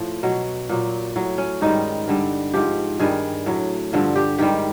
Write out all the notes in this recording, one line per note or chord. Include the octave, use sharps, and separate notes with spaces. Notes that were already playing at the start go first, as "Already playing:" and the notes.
Already playing: A2 F3
B2 F#3
A#2 F#3
A2 F#3
C#4
G#2 D#3 G3 D#4
G2 D3 G3
G#2 F3 G4
G2 D#3 G3 G#4
A2 F#3
G2 D3 F3
G4
G#2 D#3 G3 G4